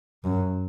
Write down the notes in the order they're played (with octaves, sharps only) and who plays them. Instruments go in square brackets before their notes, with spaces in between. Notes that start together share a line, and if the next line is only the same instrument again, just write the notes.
[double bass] F#2